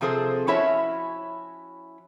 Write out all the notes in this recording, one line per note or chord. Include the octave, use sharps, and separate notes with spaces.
C3 F3 C4 G#4 A4 C5
F3 C#4 E4 F#4 C#5 E5